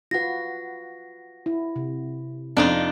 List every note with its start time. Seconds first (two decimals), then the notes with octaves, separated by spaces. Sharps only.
0.11 F4 F#4 B4 F#5 A#6
1.46 E4
1.76 C3
2.57 F2 D4 D#4 F4 D5 G5 A5